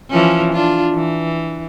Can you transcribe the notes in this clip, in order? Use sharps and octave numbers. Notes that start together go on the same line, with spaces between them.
E3 F3 C#4
D4 F4
E3